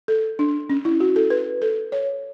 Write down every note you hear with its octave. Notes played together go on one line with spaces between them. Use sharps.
A4
D4
C#4
E4
F#4
A4
B4
A4
C#5